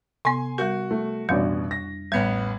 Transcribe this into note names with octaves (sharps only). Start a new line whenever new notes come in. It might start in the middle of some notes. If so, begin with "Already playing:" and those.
C3 B3 G#5 C6
G3 F#4 A#4
A3
A1 F2 B2 G3 D4 D5
A#6
A1 G3 B3 G#6